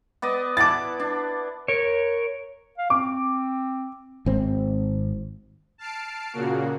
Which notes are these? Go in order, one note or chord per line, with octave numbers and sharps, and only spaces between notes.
B3 D5 D#5
E4 F#5 A5 D6 A6
D4
A#4 C#5
F5
C4 D6
G#1 C4
A5 F6 C7 D7
A#2 C#3 A#3 F#4